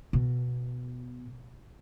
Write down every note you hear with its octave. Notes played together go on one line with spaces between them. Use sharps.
B2